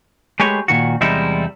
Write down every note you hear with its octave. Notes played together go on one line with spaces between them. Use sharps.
G#3 A3 G4 B4 C#5
A#2 D#3 F#4
E2 C3 G3 G#3 D#4 E4